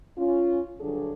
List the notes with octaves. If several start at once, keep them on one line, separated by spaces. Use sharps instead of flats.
C#4 F4
G2 D3 F#3 D4 G#4 A4